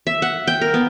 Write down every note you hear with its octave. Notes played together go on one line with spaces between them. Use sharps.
E5
F#5
G5
A#4
B3